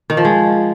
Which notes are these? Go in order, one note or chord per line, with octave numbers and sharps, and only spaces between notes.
D#3
F3
G#3